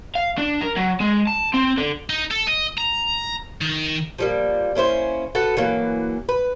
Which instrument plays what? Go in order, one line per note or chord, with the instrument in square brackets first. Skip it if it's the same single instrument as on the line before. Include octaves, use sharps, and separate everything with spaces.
[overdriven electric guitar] F5
D4
A#4
F#3
G#3
A5
C4
D3
[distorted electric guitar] D#4
A4
D#5
A#5
D#3
[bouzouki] F3 G3 A#3
A#3 C#4 E4 C5
F#4 A4 B4 F#5
E3 F#3 A#3
B4